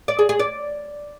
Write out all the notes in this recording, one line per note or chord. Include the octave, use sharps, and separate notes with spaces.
D5
G#4
G#4
D5